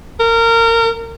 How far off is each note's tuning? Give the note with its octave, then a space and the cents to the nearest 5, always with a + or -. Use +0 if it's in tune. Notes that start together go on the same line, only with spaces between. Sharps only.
A#4 -25